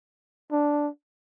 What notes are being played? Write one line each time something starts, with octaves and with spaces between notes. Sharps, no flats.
D4